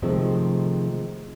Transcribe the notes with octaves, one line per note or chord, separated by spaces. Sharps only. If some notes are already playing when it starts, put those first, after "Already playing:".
C3 D#3 F3 G#3 A3 C4